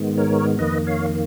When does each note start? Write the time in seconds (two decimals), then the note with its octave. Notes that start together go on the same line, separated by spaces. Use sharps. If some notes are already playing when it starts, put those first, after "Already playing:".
Already playing: G#2 D#3 G#3 B3
0.18 A#4 C#5
0.59 F2 D#3 A#3 B4 D#5
0.87 C#5 F5